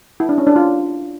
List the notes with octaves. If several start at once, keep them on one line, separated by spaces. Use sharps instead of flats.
E4
D4
C#4
D4
F4